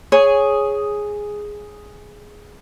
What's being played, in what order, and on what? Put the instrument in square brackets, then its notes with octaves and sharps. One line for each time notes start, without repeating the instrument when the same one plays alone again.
[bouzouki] G#4 [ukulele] C#5